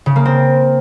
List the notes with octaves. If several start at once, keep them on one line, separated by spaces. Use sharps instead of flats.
C#3
A#3
C4